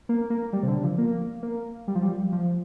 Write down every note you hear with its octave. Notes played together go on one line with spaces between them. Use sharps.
A#3
A#3
G3
C3
D3
F3
A#3
A#3
G3
F3
G3
F3